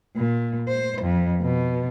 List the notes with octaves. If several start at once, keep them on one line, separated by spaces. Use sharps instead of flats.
A#2
C5
F2
B2